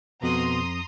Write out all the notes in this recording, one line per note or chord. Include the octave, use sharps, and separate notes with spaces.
F2 B2 A#5 C6 D#6